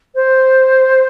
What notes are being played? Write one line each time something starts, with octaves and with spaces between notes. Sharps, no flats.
C5